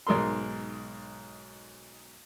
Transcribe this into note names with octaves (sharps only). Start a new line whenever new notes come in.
B1 G#2 A#4 C6